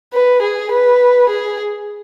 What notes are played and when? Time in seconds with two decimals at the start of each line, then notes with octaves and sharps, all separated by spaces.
0.13 B4
0.42 G#4
0.71 B4
1.30 G#4